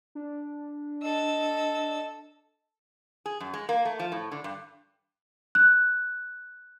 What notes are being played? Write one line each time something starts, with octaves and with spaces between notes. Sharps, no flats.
D4
A4 D#5 E6
G#4
F#2
G#3
A#3
A3
F3
A2
D3
G2
F#6